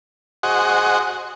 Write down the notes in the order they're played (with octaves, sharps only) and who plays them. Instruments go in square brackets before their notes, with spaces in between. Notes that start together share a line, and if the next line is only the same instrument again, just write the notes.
[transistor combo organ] F#4 G#4 C5 D#5 F#5